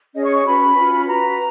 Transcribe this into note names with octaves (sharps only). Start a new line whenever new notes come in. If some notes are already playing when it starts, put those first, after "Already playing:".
C#4 G#4 C#5 D#5
C#6
C#6
C#4 F#4 B4 B5
C#4 F4 B4
F#4 B4 A#5